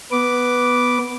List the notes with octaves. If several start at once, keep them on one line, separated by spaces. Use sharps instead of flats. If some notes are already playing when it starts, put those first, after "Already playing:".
B3 B4 D6